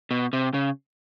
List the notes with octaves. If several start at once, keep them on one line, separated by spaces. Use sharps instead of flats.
B2
C3
C#3